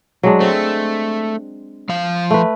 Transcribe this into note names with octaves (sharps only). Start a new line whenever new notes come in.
F#3 G#3 D4
A3 C4
F3 F5
A3 B4